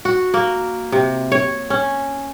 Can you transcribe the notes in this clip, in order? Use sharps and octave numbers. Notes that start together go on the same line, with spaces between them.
F#4
A#3
C3
C#5
C#4